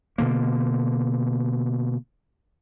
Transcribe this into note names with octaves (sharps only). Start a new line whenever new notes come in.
B2 D3 A#3